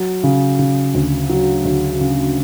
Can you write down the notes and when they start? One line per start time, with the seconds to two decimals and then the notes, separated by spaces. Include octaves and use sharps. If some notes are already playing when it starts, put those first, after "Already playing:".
Already playing: F#3
0.24 C#3
0.59 C#3
0.94 D2
1.29 F#3
1.65 D2
2.01 C#3